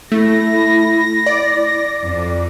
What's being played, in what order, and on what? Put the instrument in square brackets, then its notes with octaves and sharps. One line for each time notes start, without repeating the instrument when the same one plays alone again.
[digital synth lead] A3 [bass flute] E4 [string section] A#6
[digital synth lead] D5
[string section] F2